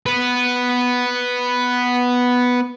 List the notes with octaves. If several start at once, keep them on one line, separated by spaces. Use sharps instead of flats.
B3 B4